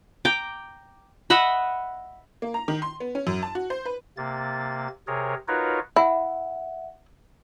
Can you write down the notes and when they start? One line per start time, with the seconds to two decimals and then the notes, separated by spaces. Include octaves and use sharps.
0.25 G5 A#5 D6
1.30 D#5 E5 F#5 B5
2.42 A#3
2.54 A#5
2.68 D#3
2.82 C6
3.00 B3
3.15 C#4
3.27 F#2
3.42 A5
3.55 F#4
3.70 C5
3.85 B4
4.17 C3 A#3 A6
5.07 C3 G#4 A#4 C#5
5.48 D#4 F4 F#4 A#4 B4 C#5
5.96 E4 E5 F#5